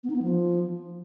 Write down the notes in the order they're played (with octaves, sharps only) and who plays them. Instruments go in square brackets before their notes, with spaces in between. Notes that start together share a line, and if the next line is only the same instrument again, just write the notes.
[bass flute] B3
D#4
B3
F3